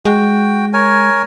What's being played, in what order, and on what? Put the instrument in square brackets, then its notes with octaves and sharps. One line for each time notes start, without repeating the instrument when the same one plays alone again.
[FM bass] G#3 [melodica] F#4 G5
[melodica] A#4 C#5 G#5